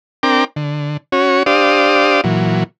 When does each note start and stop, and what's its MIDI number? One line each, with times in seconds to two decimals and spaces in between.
0.23 0.44 60
0.23 0.44 62
0.23 0.44 70
0.23 0.44 79
0.23 0.44 86
0.56 0.97 50
1.12 1.43 61
1.12 1.43 66
1.12 1.43 73
1.46 2.21 62
1.46 2.21 67
1.46 2.21 72
1.46 2.21 74
1.46 2.21 77
1.46 2.21 87
2.24 2.64 46
2.24 2.64 52
2.24 2.64 54